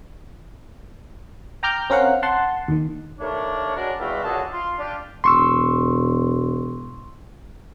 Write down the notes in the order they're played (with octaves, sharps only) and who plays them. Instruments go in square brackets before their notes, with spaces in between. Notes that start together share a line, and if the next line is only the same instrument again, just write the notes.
[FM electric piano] G5 A#5 D6 F6 G6
C4 C#4 A#4 F5 F#5
F#5 A5 C6
D#2 D#3
[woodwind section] D#2 A3 D4 A#4 C#5
F#3 G#3 D4 A#4
E2 B2 G3 F4 F#4 E5
C#2 F#2 D3 F#4 G#4 A5
F4 C6
D4 F4 G4
[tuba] E1 [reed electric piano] C6 C#6 E6